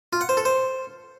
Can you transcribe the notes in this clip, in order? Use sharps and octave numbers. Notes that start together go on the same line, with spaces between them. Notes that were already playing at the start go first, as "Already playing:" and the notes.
F4
F#5
C5
A4
C5